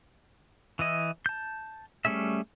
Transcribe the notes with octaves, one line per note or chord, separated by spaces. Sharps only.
E3 E4 D#5
A5 G6
G3 A3 C#4 G#4 E5